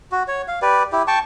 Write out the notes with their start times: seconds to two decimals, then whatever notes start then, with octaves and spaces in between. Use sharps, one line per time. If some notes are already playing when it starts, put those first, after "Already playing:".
0.12 F#4
0.28 C#5
0.48 F5
0.62 G4 B4 D5
0.92 E4 G4
1.08 G5 A5 C#6